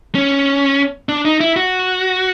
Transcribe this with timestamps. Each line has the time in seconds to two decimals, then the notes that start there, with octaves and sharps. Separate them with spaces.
0.15 C#4
1.09 D4
1.25 D#4
1.40 E4
1.56 F#4